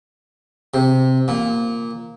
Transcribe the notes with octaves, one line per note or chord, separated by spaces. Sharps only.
C3
A#2